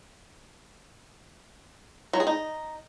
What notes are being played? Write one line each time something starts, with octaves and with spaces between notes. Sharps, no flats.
F#3
G#4
D#4